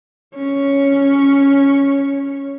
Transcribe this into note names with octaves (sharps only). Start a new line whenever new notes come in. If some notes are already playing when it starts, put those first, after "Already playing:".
C#4 C#5